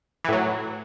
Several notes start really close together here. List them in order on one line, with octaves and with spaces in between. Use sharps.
E3 A2 F#3